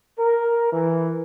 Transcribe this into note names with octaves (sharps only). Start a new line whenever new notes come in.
A#4
E3